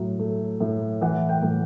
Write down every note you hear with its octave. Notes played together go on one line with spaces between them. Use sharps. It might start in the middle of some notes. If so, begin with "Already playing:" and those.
Already playing: A2 F#3
A3
A2
E3 F#5
G5
A2